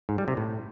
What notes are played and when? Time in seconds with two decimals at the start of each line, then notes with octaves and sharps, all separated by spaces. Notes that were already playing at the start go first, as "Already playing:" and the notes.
0.09 G#2
0.18 G3
0.28 C3
0.37 A2